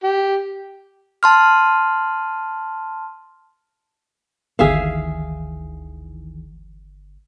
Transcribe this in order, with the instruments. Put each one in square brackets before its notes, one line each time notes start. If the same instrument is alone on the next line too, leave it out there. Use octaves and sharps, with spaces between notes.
[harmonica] G4
[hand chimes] A5 C6 F6
[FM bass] G1 [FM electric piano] D2 D#3 E3 [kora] G#4 E5 F5